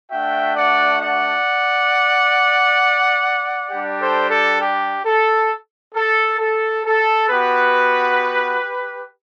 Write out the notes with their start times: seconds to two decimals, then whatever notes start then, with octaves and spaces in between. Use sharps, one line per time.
0.11 A3 D4 F#4 E5 G5
0.56 D5 F#5
1.01 D5 F#5
3.71 G3 D4 G4
4.00 A4 C5
4.31 A4
4.61 G4
5.05 A4
5.95 A4
6.39 A4
6.85 A4
7.29 B3 F#4 G4 B4